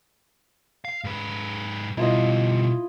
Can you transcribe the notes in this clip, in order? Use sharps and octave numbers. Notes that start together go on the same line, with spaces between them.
F5
G#2 B4
B2 G3 E4 F4 D#5